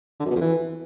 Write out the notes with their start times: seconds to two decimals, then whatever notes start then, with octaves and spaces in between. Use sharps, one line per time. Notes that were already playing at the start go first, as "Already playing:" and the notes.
0.20 D3
0.25 F#2
0.30 B2
0.36 F2
0.41 E3